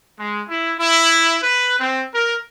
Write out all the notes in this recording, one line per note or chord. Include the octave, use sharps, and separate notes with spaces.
G#3
E4
E4
B4
C4
A#4